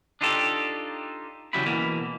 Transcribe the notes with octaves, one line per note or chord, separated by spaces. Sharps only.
D4 D#4 F4 G4 A4
E2 C#3 F#3 G3 E4 B5
B2 E3 A#3